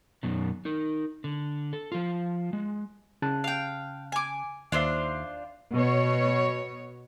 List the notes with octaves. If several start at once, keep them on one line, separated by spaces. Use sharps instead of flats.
F#2 B2 D#3
D#4 A#4
D3
A4
F3 F4
G#3
C#3 A5 F#6
F5 G5
G#5 D6
D#2 D4 F4 C5 E5
B2 C#5